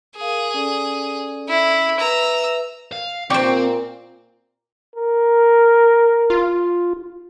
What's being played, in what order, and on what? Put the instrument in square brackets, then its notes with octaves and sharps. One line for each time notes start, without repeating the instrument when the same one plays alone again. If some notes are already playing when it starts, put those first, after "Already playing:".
[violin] G#4 [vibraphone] A#4 F5
[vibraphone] C#4 A4 D5
[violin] E4
[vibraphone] B4 E5 [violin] A#5 E6
[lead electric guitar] F5
[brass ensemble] A#2 [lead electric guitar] C4 [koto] G4 C5 [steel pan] D5 G5 C#6
[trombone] A#4
[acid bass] F4